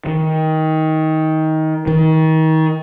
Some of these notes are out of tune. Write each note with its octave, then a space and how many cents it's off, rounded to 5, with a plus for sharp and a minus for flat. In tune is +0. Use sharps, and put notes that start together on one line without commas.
D#3 +20
D#3 +30